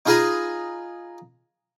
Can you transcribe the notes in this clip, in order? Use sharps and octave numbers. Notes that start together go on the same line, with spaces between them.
D#4 F4 G#4 B4 G#5 A#5